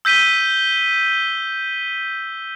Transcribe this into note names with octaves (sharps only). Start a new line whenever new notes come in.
E6 G6 B6 D#7 G7